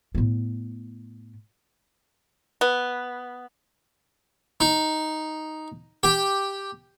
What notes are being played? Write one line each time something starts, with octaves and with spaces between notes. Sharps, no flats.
A2 B3
B3
D#4
G4